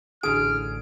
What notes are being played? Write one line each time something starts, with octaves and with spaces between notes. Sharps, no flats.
A1 D3 G#4 F6 D7